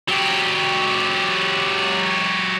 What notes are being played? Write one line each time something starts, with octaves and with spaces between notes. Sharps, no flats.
F#3 G4